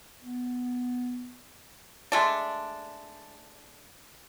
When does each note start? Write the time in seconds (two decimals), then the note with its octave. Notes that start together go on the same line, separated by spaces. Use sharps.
0.22 B3
2.12 G#3 A3 D4